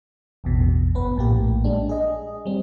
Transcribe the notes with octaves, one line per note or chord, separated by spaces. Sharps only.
A1 E2 B2
G1 B3 B4
A#1 A2 A#3 G4
G#3 D4
G#4 D#5
G3 C4